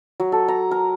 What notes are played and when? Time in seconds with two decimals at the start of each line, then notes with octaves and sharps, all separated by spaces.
0.20 F#3
0.32 A4
0.48 A#5
0.71 A#4